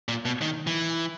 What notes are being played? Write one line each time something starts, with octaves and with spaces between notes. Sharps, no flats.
A#2
B2
D#3
E3